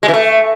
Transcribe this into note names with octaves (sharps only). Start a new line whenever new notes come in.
G#3
E3
A3